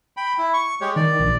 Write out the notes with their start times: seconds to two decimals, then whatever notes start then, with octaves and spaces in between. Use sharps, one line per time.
0.17 G5 B5
0.38 E4
0.54 C#6
0.81 G#3 G4 C#5
0.96 D#3 D5
1.20 A#1